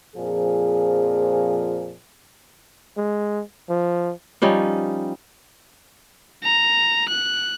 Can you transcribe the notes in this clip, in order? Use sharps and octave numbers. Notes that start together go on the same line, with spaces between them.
F2 A#2 F3 G#4
G#3
F3
F3 G3 C#4 D#4
A#5
F#6